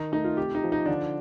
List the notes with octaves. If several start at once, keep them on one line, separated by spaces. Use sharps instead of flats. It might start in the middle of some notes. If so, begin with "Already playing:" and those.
Already playing: D#3 D#4
A3 D#4
F4
C3 G4
D#4
F3
D#4
D3 D4